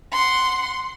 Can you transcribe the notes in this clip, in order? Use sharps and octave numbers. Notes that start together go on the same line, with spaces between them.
F#5 C6